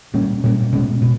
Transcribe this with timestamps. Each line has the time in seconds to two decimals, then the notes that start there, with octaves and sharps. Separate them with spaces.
0.14 A#2 G3 A#3 C#4
0.43 A#2 G3 A#3 C#4
0.72 B2 G#3 C#4
1.02 B2